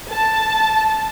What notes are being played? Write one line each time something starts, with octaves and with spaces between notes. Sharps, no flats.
A5